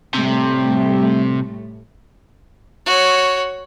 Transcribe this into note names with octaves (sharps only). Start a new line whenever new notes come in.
A2 C3 G3 A3
F#4 C#5